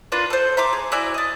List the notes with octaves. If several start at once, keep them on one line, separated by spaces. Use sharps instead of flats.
A#3 D4 F4 B4
A4 C5
E5 A#5 C6 D6
G#4
E4 F#4 D5 G#5
D#5 A5